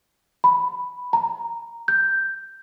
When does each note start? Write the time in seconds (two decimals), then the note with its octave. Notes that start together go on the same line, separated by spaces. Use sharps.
0.44 B5
1.13 A#5
1.88 G6